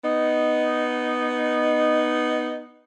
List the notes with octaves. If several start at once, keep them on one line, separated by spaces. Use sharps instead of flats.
B3 D#4